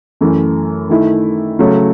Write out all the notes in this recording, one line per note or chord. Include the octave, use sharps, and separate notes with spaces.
F#2 E3 A3
D#3 A3 E4
C#3 F#3 A3 C#4